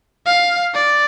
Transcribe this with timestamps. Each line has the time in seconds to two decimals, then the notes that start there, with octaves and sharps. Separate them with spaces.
0.26 F5
0.74 D5